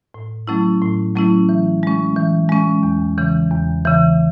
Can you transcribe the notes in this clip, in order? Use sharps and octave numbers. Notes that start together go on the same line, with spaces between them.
A2
F#3 A3 C#4 E4
A2
F#3 A3 C#4 E4
E3
G#3 C#4
E3
G#3 C#4
E2
C#3 E3
E2
C#3 E3